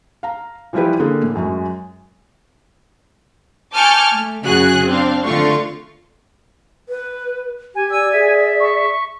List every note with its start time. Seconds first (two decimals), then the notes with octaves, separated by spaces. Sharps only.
0.23 F5 A#5
0.73 E3 F3 G3 E4 G4 B4
1.00 D3 A#3 G#4
1.23 A2
1.35 F#2 F#3 G#3
3.75 G#5 A5 C#6 D6 F6 G6
4.13 A3
4.45 F#2 C#3 F#4 G#4 F#6
4.88 C4 D4 F5
5.23 D3 A3 F4 F5 C6 C#6
6.89 B4
7.75 G4 G#5
7.91 D5 E6
8.13 G#4 E5
8.60 C#6